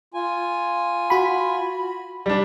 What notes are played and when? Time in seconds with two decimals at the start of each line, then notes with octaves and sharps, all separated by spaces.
0.14 F4 G#5
1.10 F#4 B5
2.26 G3 D4